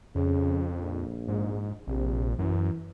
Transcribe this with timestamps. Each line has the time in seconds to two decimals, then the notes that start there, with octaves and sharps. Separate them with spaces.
0.15 F2 C#3
0.79 A#1
1.28 G#2
1.87 A#1 C3
2.39 F#2 E3